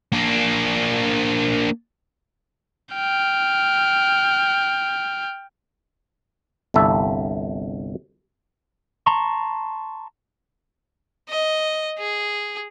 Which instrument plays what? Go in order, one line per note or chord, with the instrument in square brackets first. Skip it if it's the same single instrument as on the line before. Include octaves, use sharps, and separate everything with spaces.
[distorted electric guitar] A#3 D4
[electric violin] G5 F6
[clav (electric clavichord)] G1 C2 A4 E5
[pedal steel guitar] A5 A#5 C6 C#6
[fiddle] D#5
G#4